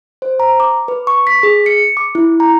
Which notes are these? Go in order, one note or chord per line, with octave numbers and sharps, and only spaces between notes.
C5
A#5
D6
B4
C#6
B6
G#4
C#7
D6
E4
A#5